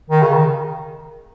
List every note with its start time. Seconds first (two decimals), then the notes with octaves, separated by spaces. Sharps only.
0.10 D#3
0.22 C#3
0.34 D#3